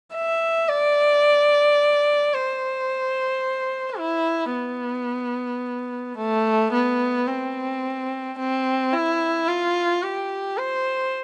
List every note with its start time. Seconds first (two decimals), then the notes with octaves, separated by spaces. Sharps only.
0.13 E5
0.68 D5
2.34 C5
3.99 E4
4.53 B3
6.17 A3
6.72 B3
7.27 C4
8.38 C4
8.93 E4
9.48 F4
10.02 G4
10.58 C5